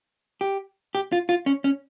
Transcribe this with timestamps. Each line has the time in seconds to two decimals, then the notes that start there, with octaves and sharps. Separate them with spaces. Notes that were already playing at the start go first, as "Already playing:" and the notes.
0.41 G4
0.95 G4
1.12 F4
1.29 F4
1.46 C#4
1.64 C#4